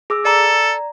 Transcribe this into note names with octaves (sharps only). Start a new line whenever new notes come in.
G#4 D6 E6
A4 D5 A#5